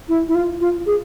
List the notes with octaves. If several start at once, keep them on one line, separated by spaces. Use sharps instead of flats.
E4
E4
F4
F4
G#4